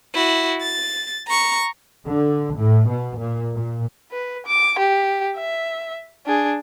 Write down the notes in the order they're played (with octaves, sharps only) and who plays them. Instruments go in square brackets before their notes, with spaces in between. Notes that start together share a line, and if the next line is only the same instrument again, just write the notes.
[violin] E4 F#4
A6
A#5 C#6
[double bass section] D3
A2
B2
A#2
A#2
[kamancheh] B4
D6
G4
E5
D4 G#4